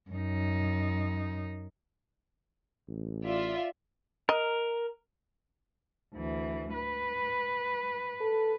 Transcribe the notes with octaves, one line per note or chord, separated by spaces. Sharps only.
F#2 D#4
A1
F4 D5 E5
A#4 D#5
D2 E3
B4
A4